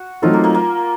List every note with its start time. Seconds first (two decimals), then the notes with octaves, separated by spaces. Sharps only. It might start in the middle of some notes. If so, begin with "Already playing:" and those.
Already playing: F#4
0.22 F#3 A3 C4 D#4 F4 A4
0.33 A#3
0.44 A#3
0.55 A#3